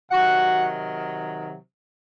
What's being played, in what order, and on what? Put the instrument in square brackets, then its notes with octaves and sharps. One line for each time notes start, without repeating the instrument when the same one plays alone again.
[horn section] C3 D#3 F#3 F#4 F#5